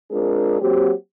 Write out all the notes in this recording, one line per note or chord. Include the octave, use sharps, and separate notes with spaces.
G#3 C4 D4 F4 G#4 A#4
F#3 A#3 C4 F#4 G4